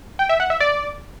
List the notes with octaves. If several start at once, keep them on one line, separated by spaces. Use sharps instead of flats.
G5
E5
F#5
E5
D5